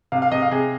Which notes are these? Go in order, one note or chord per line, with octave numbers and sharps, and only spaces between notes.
C3 F5
F5
C3 D#5
F5
C3 G#4